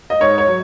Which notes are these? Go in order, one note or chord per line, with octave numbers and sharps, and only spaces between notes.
D#5
G#2 C#5
C#5
F#3